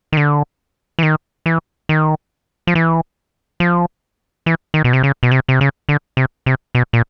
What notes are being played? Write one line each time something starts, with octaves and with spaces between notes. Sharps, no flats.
D#3
D3
E3
D#3
E3
D#3
F3
E3
F3
E3
D#3
B2
C3
C#3
B2
C3
C3
C#3
D3
C3
C3
B2
A#2